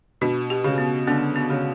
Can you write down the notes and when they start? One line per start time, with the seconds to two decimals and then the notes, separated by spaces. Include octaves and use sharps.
0.21 B2 D4
0.50 G4
0.64 C#3
0.78 B3
1.07 D3 B3
1.36 B3
1.50 C#3